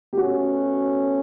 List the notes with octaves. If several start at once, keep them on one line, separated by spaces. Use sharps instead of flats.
G4
B2 A3 C#4 F#4